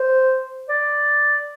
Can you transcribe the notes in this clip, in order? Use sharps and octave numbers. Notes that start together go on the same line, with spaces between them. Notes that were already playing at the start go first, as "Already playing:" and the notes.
Already playing: C5
D5